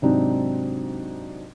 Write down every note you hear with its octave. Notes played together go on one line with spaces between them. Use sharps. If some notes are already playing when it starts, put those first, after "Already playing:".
G#2 C3 F#3 C4 D4 D#4